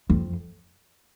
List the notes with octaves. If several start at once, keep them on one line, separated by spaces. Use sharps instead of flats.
F2